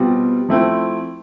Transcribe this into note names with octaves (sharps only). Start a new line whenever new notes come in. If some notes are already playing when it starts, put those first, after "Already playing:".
Already playing: B2 G3 C4 F4
F3 A3 C4 E4